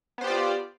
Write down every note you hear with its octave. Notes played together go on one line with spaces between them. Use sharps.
B3 F4 G4 C5 D5